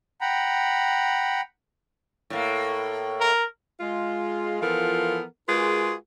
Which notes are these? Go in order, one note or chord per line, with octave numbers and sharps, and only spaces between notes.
F#5 G5 A#5 B5
A2 A#3
A#4
G#3 F4
E3 F3 B3 F4 A4 A#4
G#3 F4 F#4 G#4 A#4 B4